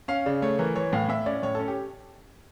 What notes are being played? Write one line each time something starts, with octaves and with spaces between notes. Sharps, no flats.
C#4 F5
C#3 D5
A3 C#5
E3 A#4
E3 C#5
A2 F5
A2 E5
C#4 D5
A2 C#5
C#4 A4
G4